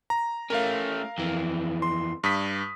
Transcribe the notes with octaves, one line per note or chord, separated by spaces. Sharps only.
A#5
A3 C#4 A#4 F5
F2 E3
C6
G2 D#6 B6